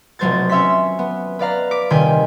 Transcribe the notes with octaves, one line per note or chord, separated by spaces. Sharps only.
F1 B1 F#3 C5 G#6 A6
C#4 E5 C6 B6
B3
B4 D5 F5 A#5
D6 B6 D7
D#1 C3 D#3 G5 G#5 B6